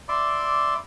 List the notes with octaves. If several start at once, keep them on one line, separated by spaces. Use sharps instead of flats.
D5 E5 B5 C6 D6